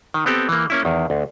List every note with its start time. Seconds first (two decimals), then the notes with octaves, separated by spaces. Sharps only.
0.14 D#3
0.26 B3 C4 G4 A4
0.49 E3 A#3
0.70 A#3 C#4 E4
0.85 E2 D#3
1.10 D2